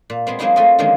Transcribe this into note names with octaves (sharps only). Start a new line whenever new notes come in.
A#2
G#3 B3 C4
F#3 G#3 A#3 C4 D#4 E4
A3 F4 F#4 D#5
D3 D#3 F3 G#3 A#3 C#4